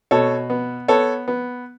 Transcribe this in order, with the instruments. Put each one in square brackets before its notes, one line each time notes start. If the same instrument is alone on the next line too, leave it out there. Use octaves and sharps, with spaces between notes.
[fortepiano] B2 A4 C#5
B3
B3 A4 C#5
B3